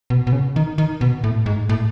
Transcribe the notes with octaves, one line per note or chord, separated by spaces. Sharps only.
B2
B2
C#3
D#3
D#3
B2
A2
G#2
A2